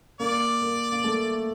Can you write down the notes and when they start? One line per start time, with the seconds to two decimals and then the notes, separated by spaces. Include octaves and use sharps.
0.20 A#3 D5
0.62 A#3
0.92 A#3
1.04 A3